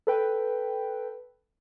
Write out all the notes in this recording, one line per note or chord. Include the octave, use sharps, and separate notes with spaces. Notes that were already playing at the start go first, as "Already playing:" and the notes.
A4 B4 G5